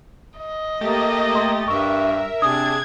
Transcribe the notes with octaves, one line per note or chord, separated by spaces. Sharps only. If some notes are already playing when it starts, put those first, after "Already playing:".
D#5
A3 A#3 G4 A6
C6
G2 A#4 E5 C#6
C3 D4 G#4 A5 D#6 G#6